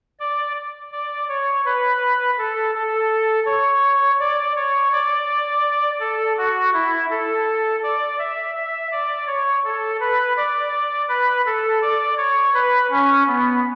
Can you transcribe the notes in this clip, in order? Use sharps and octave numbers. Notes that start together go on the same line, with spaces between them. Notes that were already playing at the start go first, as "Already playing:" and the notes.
D5
D5
C#5
B4
A4
A4
C#5
D5
C#5
D5
A4
F#4
E4
A4
D5
E5
E5
D5
C#5
A4
B4
D5
B4
A4
D5
C#5
B4
C#4
B3